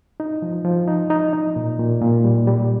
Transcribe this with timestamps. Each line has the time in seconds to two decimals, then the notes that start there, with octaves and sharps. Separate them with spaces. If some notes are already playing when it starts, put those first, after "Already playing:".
0.20 D#4
0.42 F3
0.65 F3
0.88 D#4
1.10 D#4
1.33 D#4
1.56 A#2
1.79 A#2
2.01 A#2
2.24 G3
2.47 G3